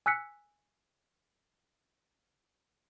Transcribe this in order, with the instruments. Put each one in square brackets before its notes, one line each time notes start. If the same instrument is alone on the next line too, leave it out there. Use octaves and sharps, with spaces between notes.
[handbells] G#5 E6 F#6 B6 C#7